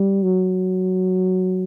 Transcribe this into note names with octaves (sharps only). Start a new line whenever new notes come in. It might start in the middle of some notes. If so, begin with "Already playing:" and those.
Already playing: G3
F#3